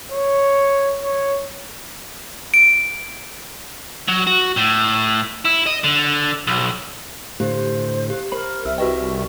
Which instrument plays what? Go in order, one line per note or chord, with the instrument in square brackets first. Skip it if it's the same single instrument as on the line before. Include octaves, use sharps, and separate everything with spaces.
[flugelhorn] C#5
C#5
[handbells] D7
[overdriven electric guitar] F#3
F#4
A2
E4
D#5
D3
B1
[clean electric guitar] A2 D3 [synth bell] G4 [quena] C5
[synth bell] G4
[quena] A#4 [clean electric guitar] C5 B5
[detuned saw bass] C2 [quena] E5 [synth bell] E6 F6
[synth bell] F#4 B4 D#5 [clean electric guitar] G4 E5 G5 [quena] C#6